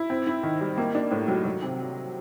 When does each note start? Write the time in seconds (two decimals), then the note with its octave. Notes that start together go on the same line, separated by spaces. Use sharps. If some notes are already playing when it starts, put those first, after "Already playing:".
Already playing: E4
0.10 C4
0.27 E4
0.43 D#3
0.61 G3
0.78 A#3
0.95 D4
1.12 A2
1.28 F#3
1.45 F#3
1.62 C3